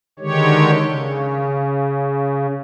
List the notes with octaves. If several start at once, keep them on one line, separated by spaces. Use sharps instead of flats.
D3 D#3 G#3 G4 C#5
C#3